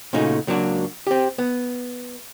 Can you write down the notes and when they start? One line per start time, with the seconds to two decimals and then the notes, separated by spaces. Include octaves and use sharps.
0.13 A#2 C#3 A3 D#4 F#4
0.47 C#2 F#3 A#3 D4 F#4
1.07 C4 G4
1.38 B3